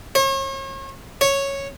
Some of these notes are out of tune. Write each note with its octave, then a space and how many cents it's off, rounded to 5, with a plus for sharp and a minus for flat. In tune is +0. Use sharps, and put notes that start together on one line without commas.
C#5 -40
C#5 -5